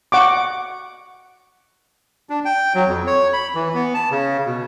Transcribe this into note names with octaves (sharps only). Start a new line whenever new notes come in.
F#5 C#6 D6
D4
G5
F#3
F2
C#5
B5
E3
B3
A5
C#3
B2